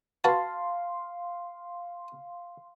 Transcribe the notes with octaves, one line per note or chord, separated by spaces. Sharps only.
F#4 B4 F5 A5 C6